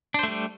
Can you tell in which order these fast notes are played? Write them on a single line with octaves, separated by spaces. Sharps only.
D4 C5 A3 G3